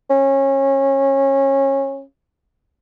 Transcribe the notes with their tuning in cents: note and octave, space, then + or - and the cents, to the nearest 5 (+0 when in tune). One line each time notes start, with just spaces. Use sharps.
C#4 -25